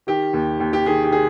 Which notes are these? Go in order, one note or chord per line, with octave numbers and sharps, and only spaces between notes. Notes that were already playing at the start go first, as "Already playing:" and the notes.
D#3 G4
D#2
D#2
G4
D#3 G#4
G4
D#3 G#4